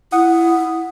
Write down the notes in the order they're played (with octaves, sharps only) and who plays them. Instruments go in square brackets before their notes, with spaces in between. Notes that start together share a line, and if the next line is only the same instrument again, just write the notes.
[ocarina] E4 [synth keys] F#5 D#6